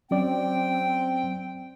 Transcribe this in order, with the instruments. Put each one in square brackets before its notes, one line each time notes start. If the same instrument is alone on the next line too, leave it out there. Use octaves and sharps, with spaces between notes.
[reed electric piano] F#3 C#4 D5 [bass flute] C4 [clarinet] G5